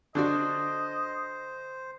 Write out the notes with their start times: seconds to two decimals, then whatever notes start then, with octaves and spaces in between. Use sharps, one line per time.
0.15 D3 D4 F#4 C5 D#5